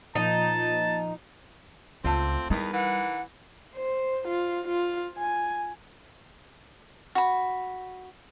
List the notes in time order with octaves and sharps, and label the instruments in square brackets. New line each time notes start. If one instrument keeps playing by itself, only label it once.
[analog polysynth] A#2 F3 [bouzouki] D#4 [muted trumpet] A5
[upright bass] C#2 [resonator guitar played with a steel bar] A3 F4 D5 [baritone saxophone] C4
[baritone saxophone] E2 [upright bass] G3 [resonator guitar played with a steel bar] D#4 A#4 B4
[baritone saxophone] E3 [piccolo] F#5
[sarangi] C5
F4
F4
G#5
[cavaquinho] F#4 B5